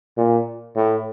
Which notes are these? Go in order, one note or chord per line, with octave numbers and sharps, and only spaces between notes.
A#2
A2